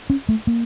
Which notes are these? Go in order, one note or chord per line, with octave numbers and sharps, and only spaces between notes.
C#4
A3
A#3